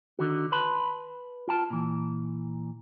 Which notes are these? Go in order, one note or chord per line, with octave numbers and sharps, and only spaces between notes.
D3 D#3 F#4
B4 A5 B5 C6
F4 G5 A5
A#2 E3